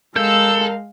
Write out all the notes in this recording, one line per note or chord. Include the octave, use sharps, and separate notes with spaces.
G#3 A4 A#4 F5 E6 G6